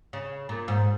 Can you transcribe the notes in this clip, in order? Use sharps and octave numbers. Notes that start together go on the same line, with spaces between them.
C#3
A#2
G#2